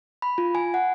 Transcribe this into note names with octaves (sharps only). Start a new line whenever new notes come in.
B5
F4
G#5
F#5